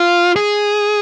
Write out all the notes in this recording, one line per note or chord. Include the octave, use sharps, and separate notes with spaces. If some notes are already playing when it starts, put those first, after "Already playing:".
Already playing: F4
G#4